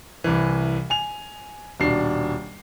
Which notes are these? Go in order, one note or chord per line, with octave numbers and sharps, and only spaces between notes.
C2 E3
G#5 F7
D#1 B2 D4 C7